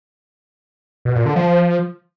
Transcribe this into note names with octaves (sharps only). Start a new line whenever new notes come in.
B2
A#2
D3
F3